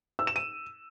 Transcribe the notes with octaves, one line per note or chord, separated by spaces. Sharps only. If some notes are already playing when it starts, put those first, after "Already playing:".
E6
E7
D#7